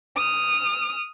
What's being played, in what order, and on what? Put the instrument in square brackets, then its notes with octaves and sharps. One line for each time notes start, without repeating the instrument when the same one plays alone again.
[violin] D#6 F6